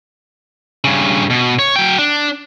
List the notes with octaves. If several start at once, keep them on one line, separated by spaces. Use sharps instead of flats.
G2 C#3
B2
C#5
F#3 G5
D4